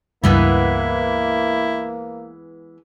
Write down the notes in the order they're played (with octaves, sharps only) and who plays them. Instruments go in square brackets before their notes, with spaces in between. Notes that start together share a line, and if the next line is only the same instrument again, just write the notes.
[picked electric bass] C#2 G2 [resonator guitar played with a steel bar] E3 G#3 B3 [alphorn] A#3 [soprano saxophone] E4